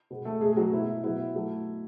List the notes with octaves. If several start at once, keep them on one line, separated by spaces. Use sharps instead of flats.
B2 G#3 B3
A3 A4
B2 G#3 A3 G#4
G#4
F#3 F#4
B2 G#3 B3 E4
B2 F#3 B3 E4
F#3 A3